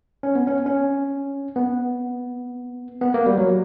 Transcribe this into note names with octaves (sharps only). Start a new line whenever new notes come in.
C#4
B3
C#4
C#4
B3
B3
A#3
G3
F#3